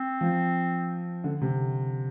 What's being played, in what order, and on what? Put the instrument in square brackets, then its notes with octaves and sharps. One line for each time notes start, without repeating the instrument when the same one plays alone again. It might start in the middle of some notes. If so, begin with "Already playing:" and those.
Already playing: [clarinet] C4
[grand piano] F3
D3
C3